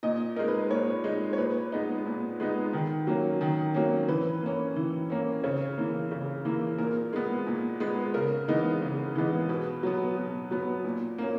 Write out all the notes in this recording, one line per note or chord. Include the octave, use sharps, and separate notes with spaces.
A#2 D#5
G#3 D#4 A#4
B4
A#2 C#5
G#3 D#4
C#5
A#2 B4
G#3 B3 D#4
A#2
G#3 B3 D#4
D#3
F#3 A#3 C#4
D#3
F#3 A#3 C#4
E3 B4
A#3 C#4
E3
A#3 C#4
C#3 C#5
E3 A#3
C#3
E3 A#3
A#2 A#4
G#3 B3
A#2
G#3 B3
C#3 A#4
E3 G#3 B3 D#4
C#3
E3 G#3 B3 D#4
B2 B4
F#3 B3
B2
F#3 B3
A#2
A#3 C#4